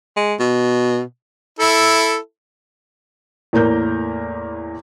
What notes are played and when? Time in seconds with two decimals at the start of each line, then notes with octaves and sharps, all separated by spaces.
0.17 G#3
0.40 B2
1.59 E4 A4
3.53 E2 A2 A#3 A#4 G6